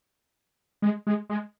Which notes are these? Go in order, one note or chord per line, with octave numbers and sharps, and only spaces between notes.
G#3
G#3
G#3